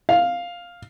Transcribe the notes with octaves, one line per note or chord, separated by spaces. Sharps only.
F5